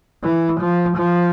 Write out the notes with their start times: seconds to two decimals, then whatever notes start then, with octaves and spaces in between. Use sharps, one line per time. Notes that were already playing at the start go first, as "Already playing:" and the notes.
0.24 E3
0.60 F3
0.97 F3